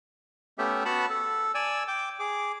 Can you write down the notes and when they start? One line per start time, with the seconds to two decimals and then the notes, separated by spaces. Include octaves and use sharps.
0.58 A3 B3 C#4 G4 E5
0.85 B3 F#4 F#5 A5 B5
1.10 A4
1.55 D5 G#5 E6
1.88 G5 D6
2.20 G#4 D6